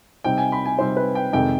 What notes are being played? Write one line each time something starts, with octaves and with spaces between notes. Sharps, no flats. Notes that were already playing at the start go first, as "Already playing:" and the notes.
C3 G3 C4 D#4 G5
G#5
B5
G#5
C3 G3 C4 D#4 C5
B4
G5
F2 C3 D#3 G#3 G5